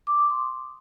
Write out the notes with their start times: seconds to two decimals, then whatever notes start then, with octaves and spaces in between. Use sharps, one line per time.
0.07 D6
0.18 D#6
0.30 C6